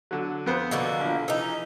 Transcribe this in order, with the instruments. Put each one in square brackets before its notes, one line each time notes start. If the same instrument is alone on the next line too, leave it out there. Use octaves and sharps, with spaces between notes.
[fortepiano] D3 F#3
F2 B3 C5
[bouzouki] B2 D3 A#3
[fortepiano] A#1 F3
[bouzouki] E3 D#4